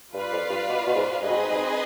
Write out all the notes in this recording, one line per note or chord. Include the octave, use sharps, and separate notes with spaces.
G2 F4 B4 D5 F5
F2
G2
B2
B2
G#2
G2 C4 D#4 G#4 B4 D#5
B2
G#2
G#2